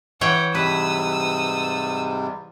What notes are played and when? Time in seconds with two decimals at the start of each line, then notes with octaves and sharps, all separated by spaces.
0.21 E3 C#5 F#5 G5
0.55 G#2 C3 G3 B4 D#6 E6